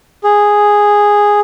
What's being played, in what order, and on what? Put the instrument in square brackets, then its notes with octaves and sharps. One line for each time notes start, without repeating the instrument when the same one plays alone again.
[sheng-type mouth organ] G#4